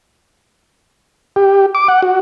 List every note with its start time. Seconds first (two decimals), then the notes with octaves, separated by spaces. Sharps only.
1.36 G4
1.75 D6
1.88 F#5
2.02 F#4